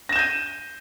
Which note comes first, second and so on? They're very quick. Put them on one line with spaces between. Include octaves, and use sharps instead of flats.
A#6 E7 G6 D#7